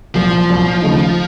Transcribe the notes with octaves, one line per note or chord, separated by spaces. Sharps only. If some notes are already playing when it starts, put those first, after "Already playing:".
C2 A#2 F3 F#3
C2 A#2 F#3
D#2 C#3 A3 D#4